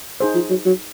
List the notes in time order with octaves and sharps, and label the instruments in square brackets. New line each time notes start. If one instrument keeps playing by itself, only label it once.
[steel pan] D#4 G#4 C5
[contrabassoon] F3
F#3
F#3